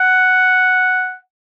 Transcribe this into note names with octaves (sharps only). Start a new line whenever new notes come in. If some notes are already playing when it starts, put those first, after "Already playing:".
Already playing: F#5